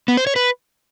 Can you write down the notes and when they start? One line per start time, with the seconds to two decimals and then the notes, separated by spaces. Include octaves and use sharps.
0.08 B3
0.17 C5
0.27 C#5
0.36 B4